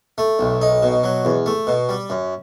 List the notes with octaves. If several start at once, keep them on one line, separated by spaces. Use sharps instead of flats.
A3
B1
D#4
B2
F#3
E2
A3
B2
G3
F#2